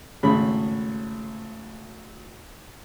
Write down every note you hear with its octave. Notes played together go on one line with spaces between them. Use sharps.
G#1 A2 C#3 B5